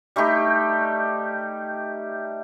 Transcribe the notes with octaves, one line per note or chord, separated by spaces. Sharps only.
G3 A3 D#4 G4